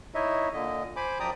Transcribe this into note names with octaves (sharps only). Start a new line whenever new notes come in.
D#4 E4 C#5 D#5 E5
A#2 D3 D#5
C5 G#5 B5 D6
F#2 F3 D5 G5 A#5 D#6